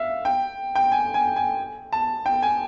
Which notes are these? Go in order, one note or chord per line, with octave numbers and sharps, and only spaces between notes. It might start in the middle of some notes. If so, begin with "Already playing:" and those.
Already playing: E5 F5
G5
G5
G#5
G#5
G#5
A5
G5
G#5